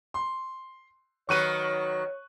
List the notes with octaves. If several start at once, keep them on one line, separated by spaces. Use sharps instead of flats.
C6
D#3 F#3 B4 C#5 C#6 F#6 D#7